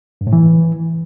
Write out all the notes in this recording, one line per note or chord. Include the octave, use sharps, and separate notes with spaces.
G2
A2
E3